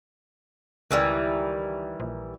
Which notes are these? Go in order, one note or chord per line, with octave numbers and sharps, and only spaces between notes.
C#2 D#3 E3 G3
A#1